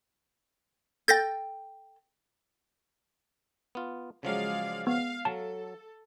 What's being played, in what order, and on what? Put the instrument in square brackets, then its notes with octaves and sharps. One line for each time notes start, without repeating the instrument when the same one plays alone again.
[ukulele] A4 G5 [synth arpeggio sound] G6 A6 A#6
[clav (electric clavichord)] B3 F4
[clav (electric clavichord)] C#3 F3 F#3 [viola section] G#3 D5 F5
[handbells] B3 [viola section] F5
[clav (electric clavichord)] F#3 [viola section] A4 [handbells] A5